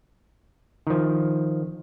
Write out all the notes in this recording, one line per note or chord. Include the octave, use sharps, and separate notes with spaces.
D#3 F3